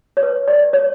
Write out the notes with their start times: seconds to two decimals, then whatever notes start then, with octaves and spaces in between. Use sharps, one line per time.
0.17 C#5
0.23 B4
0.48 D5
0.73 C#5